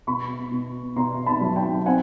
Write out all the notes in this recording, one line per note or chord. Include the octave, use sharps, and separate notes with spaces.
B2 B5 C#6
B2
B2 A#5 C6
A5 B5
F#3
G5 A5
C4 F#5 G#5